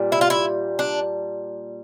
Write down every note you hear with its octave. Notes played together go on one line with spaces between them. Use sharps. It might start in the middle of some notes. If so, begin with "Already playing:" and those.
Already playing: A#2 G3
E4
F4
E4
D4